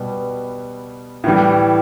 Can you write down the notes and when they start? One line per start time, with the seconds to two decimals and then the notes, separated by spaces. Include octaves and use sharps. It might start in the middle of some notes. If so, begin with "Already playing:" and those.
Already playing: B2 G3 B3
1.24 A2 E3 G3